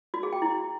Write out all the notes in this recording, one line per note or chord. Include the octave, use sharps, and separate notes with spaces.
F#4
G#4
G5
E4